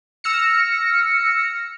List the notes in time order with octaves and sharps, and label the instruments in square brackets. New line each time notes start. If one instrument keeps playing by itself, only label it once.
[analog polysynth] E6 F6 A#6 C#7